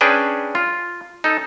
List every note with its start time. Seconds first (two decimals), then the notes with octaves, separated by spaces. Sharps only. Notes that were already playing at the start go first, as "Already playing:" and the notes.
0.01 C#4 D4 G#4 B4 G5
0.55 F4
1.24 D#4 A4